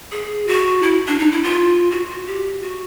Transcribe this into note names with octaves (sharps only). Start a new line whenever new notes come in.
G#4
F#4
E4
D4
D#4
E4
F4
F#4
F#4
G4
F#4